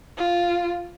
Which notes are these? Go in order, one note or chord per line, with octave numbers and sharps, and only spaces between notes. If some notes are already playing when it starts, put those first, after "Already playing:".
F4